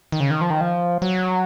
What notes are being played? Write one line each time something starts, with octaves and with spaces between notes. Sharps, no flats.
D#3
C#3
D#3
F3
D#3
F3
F#3